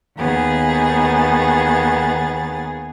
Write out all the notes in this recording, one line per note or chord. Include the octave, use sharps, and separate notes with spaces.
D#2 D#3 B3 G#4 A6